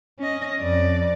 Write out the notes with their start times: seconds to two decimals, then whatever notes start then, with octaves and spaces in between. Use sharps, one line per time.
0.19 C#4 D#5
0.61 F2 D5